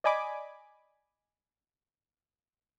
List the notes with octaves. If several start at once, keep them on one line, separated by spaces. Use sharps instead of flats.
D5 D#5 G#5 B5 D6